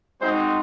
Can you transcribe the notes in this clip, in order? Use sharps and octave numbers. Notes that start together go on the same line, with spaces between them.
G#3 C4 D#4 F#4 C5